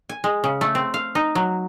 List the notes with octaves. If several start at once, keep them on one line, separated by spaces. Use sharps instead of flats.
G#5
G#3
C#3
A3
C4
F5
D#4
F#3